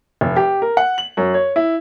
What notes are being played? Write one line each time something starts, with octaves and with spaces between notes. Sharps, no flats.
F1
G4
A#4
F#5
F#7
F#2
C#5
E4